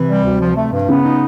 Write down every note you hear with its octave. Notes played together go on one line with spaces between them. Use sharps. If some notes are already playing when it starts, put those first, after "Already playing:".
Already playing: C3 E3
G3
D2
F3
A3
G2
C#3 B3
D#4